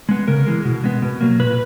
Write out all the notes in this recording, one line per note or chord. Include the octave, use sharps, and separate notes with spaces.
G#3 B3
C#3 A#4
E3 G#3
B2
G#3 B3
B2
F#3 A#3
A#2 B4